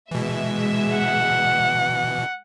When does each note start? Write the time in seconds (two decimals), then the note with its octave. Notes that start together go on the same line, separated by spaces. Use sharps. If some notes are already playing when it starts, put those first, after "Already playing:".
0.11 B2 E3 G#3 E5
0.97 F#5